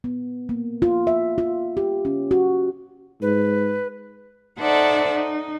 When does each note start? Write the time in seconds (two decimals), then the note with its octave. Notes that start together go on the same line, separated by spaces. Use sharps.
0.04 B3
0.49 A#3
0.82 F4
1.07 E5
1.38 F4
1.77 G4
2.05 C#4
2.31 F#4
3.22 G#2 B4
4.60 D#4 A4 C5 D5 E5 F#5
5.14 D#4